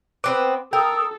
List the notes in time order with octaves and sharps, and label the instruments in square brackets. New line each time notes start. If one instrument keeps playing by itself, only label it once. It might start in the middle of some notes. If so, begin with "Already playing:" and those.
[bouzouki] B3 C4 B4 [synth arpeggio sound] D6
[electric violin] A4 [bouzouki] A#4 [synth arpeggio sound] G5 [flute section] D#6 E6